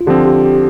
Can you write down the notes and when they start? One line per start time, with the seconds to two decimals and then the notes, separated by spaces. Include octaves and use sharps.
0.01 F4
0.07 D3 F3 C4 G4
0.26 G4
0.45 G4